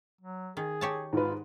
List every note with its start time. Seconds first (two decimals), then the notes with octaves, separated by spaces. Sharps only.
0.21 F#3
0.57 D#3 G#4
0.81 G4 C#5 A5
1.13 G#2 F4 B4